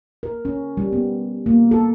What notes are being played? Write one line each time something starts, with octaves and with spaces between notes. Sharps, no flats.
A#4
C#4
G3
B3
A#3
A4